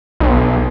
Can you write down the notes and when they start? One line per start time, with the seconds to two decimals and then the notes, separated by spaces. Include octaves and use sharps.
0.20 B1